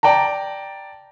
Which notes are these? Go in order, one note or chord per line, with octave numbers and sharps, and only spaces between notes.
D5 G5 A5 A#5